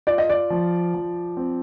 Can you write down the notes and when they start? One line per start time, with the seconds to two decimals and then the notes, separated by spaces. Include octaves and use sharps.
0.07 F4 D5
0.18 D#5
0.30 D5
0.50 F3
0.94 F3
1.37 C4